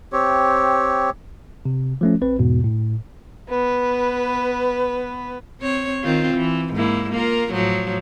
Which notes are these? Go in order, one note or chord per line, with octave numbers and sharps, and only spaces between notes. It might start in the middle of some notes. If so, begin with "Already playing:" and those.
C4 G4 C#5
C3
F3 A3 C#4
A#1 C4 B4
E2 G#2 B2
A2
B3 B4
C4 C#5
D#3 C4 F4
E3
G#2 A#3 E4
A#3 F4 A#4
A2 F3 F#3